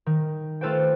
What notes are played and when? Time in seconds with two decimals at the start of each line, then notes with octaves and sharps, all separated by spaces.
0.06 D#3
0.61 A3 F4 A4 B4 C5 G5